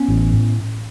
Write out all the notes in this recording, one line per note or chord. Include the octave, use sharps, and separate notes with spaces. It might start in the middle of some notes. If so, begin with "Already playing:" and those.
Already playing: B3 C#4
A1
A2